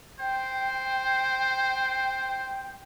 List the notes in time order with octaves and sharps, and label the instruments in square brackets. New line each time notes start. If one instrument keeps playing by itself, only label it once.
[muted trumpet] C5 [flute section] G5